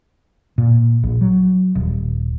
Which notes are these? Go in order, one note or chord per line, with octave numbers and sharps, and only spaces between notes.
A#2
A#1
F#3
D#1